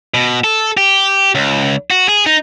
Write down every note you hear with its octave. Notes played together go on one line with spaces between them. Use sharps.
B2
A4
G4
C#2
F#4
G#4
D#4